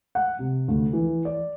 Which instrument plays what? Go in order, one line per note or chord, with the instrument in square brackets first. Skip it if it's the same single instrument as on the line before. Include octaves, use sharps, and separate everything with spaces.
[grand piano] F#5
C3
D2
E3
D5